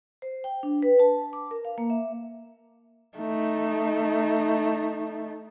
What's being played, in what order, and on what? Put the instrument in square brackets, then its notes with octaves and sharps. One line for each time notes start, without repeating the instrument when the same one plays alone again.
[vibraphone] C5
G5
D4
B4
A5
D6
A#4
F5
A#3
E5
[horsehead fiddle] A3 D#4